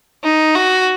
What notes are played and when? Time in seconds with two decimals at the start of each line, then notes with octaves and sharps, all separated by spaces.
0.24 D#4
0.56 F#4